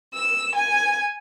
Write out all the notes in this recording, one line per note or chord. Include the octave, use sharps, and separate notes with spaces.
E6
G#5